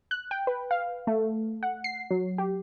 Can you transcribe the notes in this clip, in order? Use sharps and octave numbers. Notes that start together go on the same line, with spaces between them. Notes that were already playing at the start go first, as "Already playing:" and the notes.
F#6
G5
B4
F5
A3
F#5
C7
F#3
G4